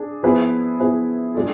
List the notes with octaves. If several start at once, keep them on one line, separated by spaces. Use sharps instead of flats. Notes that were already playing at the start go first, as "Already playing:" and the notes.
Already playing: D4 G#4
F3 B3 E4 G#4 B4
F3 B3 E4 G#4 B4
G#3 D4 F4 A4